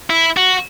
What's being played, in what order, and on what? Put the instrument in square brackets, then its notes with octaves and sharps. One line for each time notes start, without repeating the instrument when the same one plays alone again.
[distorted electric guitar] E4
F#4